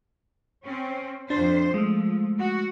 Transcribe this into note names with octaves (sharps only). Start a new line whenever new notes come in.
C4 C#4
F2 D4 C5
F3 G#3 A3
F#4